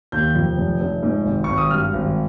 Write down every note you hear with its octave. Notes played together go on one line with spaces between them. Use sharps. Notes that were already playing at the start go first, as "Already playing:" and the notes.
D#2 G6
F2
F1
F1
G#2
G#1
G#1 C#6
D#6
G2 F6
G#1